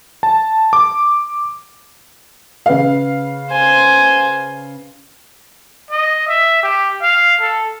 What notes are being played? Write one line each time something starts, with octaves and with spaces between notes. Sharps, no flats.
A5
D6
C#3 B4 F5
C5 G#5
D#5
E5
G4
F5
A4